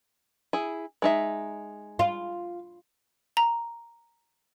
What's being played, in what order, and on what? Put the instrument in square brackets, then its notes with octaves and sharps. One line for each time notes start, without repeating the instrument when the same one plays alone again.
[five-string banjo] E4 G#4
G#3 D#4 E5
[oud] F4
[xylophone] A#5